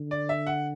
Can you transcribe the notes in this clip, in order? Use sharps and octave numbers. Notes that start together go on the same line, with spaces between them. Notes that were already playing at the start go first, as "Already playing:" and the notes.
Already playing: D3
D5
E5
F#5